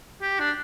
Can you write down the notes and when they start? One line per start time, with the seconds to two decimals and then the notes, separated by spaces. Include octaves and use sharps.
0.22 G4
0.40 D4